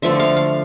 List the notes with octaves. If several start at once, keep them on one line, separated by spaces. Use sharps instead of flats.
D3 F3 A3 E5
F5
F5